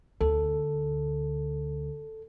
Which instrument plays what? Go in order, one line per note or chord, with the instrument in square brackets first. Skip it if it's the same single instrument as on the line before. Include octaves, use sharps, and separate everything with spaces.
[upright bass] D2 [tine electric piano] A4